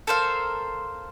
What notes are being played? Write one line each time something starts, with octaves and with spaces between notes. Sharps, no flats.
A4 A#4 C5 F5